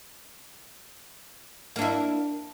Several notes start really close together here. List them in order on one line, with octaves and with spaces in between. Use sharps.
A#3 D4 E4